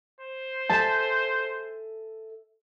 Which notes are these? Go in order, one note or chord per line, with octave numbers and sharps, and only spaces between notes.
C5
A4 E5 G#5 A5